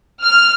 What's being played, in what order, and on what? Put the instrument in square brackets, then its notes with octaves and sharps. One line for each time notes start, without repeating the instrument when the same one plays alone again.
[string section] F6